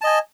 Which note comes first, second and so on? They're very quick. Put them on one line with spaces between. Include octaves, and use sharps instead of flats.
A5 D#5 G#5